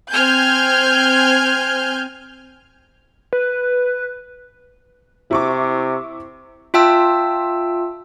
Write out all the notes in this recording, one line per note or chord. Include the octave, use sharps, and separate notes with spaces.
C4 G#5 F6 G6
B4
C3 E4 C#6 D6
F4 E5 G5 A5 E6